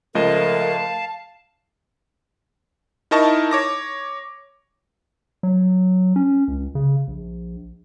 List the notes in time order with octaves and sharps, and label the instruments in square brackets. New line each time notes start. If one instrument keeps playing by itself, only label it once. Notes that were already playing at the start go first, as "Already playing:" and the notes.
[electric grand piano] C#2 F3 D#5 [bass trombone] A3 [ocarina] A#4 [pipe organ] F5 A5
[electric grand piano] D#4 E4 A#4 D#5 A5 C#6
C#5 D6 A#6
[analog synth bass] F#3
C#4
C#2
C#3
A#1